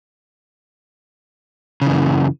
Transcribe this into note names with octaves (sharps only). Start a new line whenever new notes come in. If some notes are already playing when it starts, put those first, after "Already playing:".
F#2 C#3 E3